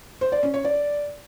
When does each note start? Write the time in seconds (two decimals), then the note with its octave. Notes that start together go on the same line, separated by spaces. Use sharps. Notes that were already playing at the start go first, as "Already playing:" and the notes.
0.21 C5
0.32 D5
0.43 C#4
0.54 C#5
0.65 D5